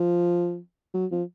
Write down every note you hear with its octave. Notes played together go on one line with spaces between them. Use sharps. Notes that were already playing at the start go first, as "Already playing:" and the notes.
Already playing: F3
F#3
F3